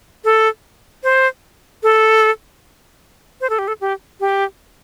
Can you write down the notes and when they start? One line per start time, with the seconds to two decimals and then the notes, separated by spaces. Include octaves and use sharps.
0.24 A4
1.04 C5
1.83 A4
3.41 C5
3.50 A4
3.59 G4
3.68 A4
3.81 G4
4.20 G4